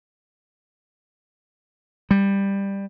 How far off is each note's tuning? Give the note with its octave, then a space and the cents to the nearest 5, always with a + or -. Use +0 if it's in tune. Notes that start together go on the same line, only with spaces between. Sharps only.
G3 +10